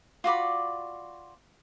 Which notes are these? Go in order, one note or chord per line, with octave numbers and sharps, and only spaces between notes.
F4 F#4 D5 B5